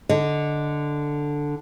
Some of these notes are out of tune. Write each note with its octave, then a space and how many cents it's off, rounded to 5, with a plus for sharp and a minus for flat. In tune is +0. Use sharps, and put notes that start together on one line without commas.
D3 +0 D#5 +0